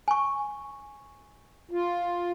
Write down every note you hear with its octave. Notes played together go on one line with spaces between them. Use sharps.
G#5 C#6
F4